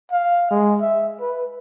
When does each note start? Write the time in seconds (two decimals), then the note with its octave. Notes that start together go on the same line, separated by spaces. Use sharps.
0.12 F5
0.51 G#3
0.81 E5
1.21 B4